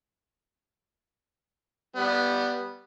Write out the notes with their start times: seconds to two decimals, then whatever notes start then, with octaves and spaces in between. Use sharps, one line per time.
1.96 G3 B3